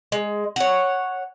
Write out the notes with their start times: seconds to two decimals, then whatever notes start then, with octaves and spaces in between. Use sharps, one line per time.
0.12 G#3
0.56 C#5 F#5